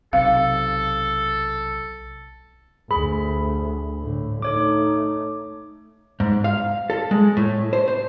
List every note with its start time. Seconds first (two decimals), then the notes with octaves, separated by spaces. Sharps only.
0.13 B1 C3 A4 F5
2.91 D2 G#4 B5
4.00 A2 D3
4.42 A3 D#4 A4 C#5 D6
6.20 G#2
6.44 F5
6.90 A4
7.11 G#3
7.37 A2
7.73 C5
7.88 C5